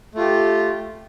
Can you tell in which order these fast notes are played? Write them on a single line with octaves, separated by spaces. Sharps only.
A3 F4 G4